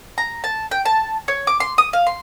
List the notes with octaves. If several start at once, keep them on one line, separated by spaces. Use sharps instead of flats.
A#5
A5
G5
A5
C#5
D6
C6
D#6
F5
C6